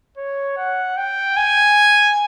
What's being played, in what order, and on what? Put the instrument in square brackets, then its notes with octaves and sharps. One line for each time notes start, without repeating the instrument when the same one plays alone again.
[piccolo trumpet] C#5
F#5
G5
G#5